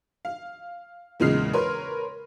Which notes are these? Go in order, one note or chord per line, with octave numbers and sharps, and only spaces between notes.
F5
E2 A#2 C#3 G#3 F6 C7
A#4 B4 C#5 C6